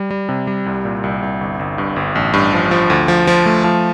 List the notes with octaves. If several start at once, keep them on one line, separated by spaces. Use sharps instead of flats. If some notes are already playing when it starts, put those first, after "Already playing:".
Already playing: G3
G3
C3
G3
C2
A#2
C2
C2
G1
G1
G2
G1
A1
G2
F3
F3
D2
F3
F3
A3
F3